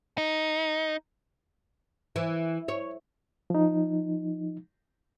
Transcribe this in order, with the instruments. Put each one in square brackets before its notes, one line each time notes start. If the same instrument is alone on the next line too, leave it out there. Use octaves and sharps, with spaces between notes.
[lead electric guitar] D#4
[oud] E3
C#5
[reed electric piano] F3 D#4